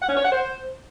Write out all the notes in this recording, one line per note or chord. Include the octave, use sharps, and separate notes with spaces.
F#5
C#4
C#5
F#5
C5